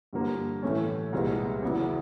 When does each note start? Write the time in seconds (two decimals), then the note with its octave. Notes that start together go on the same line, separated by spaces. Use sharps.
0.13 G2 D3 F3 A#3
0.63 A2 E3 A3 C#4
1.13 C2 A#2 F3 G#3 B3
1.62 E2 C#3 F#3 B3 E4